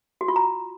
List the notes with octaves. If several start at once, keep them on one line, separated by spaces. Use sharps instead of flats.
F#4
F4
A#5